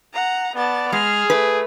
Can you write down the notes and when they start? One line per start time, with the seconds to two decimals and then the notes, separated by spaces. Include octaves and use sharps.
0.13 F#5 A#5
0.56 B3 D5 A5
0.92 G#3 G#4 F6
1.30 A3 B4